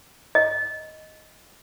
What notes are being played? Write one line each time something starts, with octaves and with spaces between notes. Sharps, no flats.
D#5